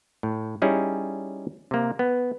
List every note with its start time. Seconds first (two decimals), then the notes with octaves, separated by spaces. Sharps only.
0.23 A2
0.62 G3 C#4 D#4 E4 G#4
1.71 C3 A#3
1.99 B3